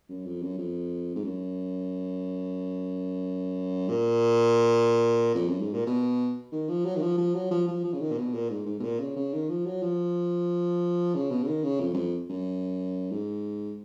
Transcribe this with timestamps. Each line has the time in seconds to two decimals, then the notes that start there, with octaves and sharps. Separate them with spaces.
0.09 F#2
0.25 F2
0.42 F#2
0.58 F2
1.15 G#2
1.24 F#2
3.89 A#2
5.35 F2
5.48 F#2
5.61 G#2
5.74 A#2
5.86 B2
6.52 D#3
6.69 F3
6.85 F#3
6.96 D#3
7.02 F3
7.18 F3
7.35 F#3
7.51 F3
7.68 F3
7.84 F3
7.93 C#3
8.01 D#3
8.12 A#2
8.18 B2
8.34 A#2
8.50 G#2
8.66 G#2
8.80 B2
8.84 A#2
9.00 C#3
9.16 C#3
9.34 D#3
9.49 F3
9.66 F#3
9.83 F3
11.15 C#3
11.31 B2
11.43 C#3
11.47 D#3
11.64 C#3
11.80 F2
11.93 F#2
11.97 F2
12.30 F#2
13.12 G#2